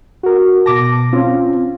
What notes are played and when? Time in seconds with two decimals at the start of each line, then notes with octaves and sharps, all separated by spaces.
0.23 F#4 A#4
0.66 B2 A5 D6 A#6
1.13 C4 C#4 F4